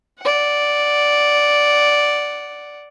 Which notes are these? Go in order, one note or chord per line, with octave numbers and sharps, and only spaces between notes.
D5 F#5